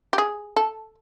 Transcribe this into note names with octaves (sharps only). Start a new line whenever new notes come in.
G4
G#4
A4